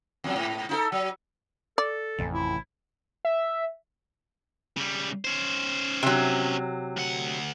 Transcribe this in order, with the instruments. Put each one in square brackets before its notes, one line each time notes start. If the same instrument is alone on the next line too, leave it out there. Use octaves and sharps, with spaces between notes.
[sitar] E2 F#3
G#2
D#4 E4 A4
F#3
[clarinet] A4 [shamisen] D5
[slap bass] A1 C3 [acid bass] F2
[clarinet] E4
[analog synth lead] E5
[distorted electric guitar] C#3 G3
C#4 C5
[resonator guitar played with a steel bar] C3 F#3
[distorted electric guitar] D2 F#5